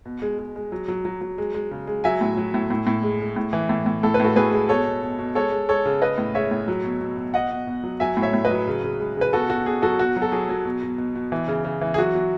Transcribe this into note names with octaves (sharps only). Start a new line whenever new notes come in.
B2
G#3
G#3
G#3
F#3
F#3
F#3
F#3
G#3
G#3
C#3
G#3
F#3 E5 G#5
A2
F#3
A2
A2
A2
G#3
G#3
A2
E3
A2
A2
A2 A4
B4
A2 F#4 A4
A2 G#4 B4
G#3
B2 A4 C#5
B2
B2
B2
G#3 A4 C#5
G#3
G#3 A4 C#5
C#3
G#3 B4 D#5
A2
G#3 C#5 E5
A2
F#3
B2
B2
B2
B2 D#5 F#5
B2
B2
F#3
F#3 E5 G#5
A2
C#5 E5
A2
B4 D#5
F#3
C#3
C#3
G#3
C#3 B4
B2 F#4 A4
B2 F#4
B2 G#4
F#3 F#4 A4
B2 F#4
F#3
A4
F#3 G#4
F#3
B2
B2
B2
B2
E3
C#3
C#3
E3
G#4
F#3 F#4
F#3